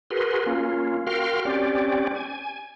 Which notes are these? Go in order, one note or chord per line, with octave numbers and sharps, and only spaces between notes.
F#4 G#4 A#4 B4 C6
A#3 C#4 F4
F#4 A#4 F5 G5 C6 F6
C4 C#4 G4 D5
G#5